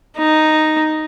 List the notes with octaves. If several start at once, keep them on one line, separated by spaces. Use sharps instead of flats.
D#4